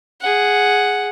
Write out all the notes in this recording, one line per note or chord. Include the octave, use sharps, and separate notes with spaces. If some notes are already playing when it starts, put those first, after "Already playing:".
G#4 F#5